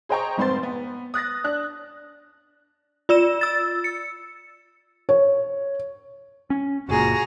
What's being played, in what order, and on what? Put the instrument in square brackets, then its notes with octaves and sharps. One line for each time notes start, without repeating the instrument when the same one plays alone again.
[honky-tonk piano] G#4 C5 D#5 G5 A#5 C#6
F1 G#2 C4 C5 C6 A6
B3
D#6 F#6 A6 A#6
D4 F#6
[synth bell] F4 D5 E6 E7
E6 A6
C#7
[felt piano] C#5
[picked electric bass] C#4
[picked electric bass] F#1 A#2 [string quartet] F#4 G#4 A#5